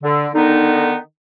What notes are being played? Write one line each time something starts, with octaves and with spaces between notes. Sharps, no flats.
D3
D3 D#3 B3 D#4